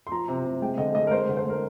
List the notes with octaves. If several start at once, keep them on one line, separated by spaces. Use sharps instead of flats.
C6
F3 A#5
C3
C3
G#3 G5
D3 D#5
G#3 D#5
A#4
G#3 C5
D3
C5
G#3
A#4